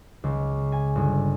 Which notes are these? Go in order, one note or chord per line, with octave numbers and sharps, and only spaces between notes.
C#2
G#5
G1